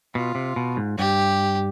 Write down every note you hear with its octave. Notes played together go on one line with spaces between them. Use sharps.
B2 F4
C3
B2
G#2
G2 G4